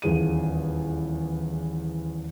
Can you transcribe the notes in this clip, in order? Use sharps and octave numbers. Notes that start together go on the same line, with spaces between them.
D#1 E2 G#4 D#7